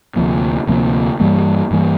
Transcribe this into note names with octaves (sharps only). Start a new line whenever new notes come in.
D2 C3 F3 A#3
D2 C3 F3 A#3
G2 E3 G3 A#3
G2 E3 G3 A#3